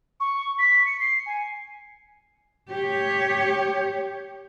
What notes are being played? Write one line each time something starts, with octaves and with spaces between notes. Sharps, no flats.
C#6
B6
C#7
C7
G#5
G4 C#5